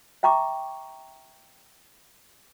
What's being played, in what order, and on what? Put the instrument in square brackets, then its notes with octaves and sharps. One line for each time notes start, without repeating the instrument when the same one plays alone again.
[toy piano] E5 G5 A#5 C#6 D6